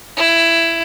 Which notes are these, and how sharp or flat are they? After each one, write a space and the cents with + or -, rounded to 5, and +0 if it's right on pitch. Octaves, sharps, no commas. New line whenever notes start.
E4 +15